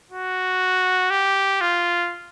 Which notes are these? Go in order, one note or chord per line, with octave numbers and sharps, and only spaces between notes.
F#4
G4
F4